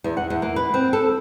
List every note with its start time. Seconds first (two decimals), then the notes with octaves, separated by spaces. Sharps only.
0.04 E2
0.17 F#5
0.30 E2
0.42 A#3
0.56 B4
0.74 C4
0.93 A4